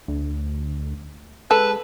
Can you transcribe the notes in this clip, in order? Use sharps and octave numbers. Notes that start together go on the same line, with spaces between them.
D2
G#3 A4 B4